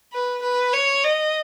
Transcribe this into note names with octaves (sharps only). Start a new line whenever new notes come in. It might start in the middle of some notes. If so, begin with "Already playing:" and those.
B4
B4
C#5
D#5